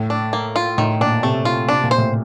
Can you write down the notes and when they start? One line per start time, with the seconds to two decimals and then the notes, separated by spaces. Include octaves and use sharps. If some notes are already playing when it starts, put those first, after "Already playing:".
Already playing: A2
0.10 D4
0.33 A#3
0.56 F4
0.78 A2 D#3
1.00 A#2 D4
1.23 C3 A3
1.45 F4
1.69 C3 D4
1.84 A#2
1.91 C5
1.98 A2